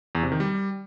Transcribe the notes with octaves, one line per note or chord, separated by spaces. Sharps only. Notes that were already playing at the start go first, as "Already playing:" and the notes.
E2
C3
D#3
G3